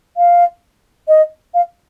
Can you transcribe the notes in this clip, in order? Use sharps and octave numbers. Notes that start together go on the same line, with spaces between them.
F5
D#5
F5